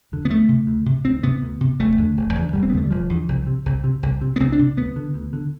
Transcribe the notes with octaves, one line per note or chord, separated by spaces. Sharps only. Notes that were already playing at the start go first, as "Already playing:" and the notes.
E2 D3
B3
D2 A3
C3
D2
C3
D2 C4
C3 B3
D2
C3
E1 A3
E2 D3
E1
E2 D3
E1 G3
C4
B3
E2 D3 A3
G3
E1 F3
E2 D3
C2
C3
C2
C3
C2
C3
B3
C2 C4
D4
C3
D2 B3
D3
D2
D3